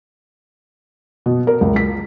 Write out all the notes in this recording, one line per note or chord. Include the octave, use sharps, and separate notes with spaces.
B2
A#4
C#2
B6